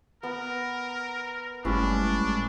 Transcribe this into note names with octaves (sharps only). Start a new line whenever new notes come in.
B3 A#4
G1 A2 G3 G#3 C#4 D4 E4